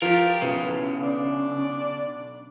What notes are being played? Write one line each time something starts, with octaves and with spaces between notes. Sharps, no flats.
F3 F4 G4 A#4 A6
B1 C#3 E3
D4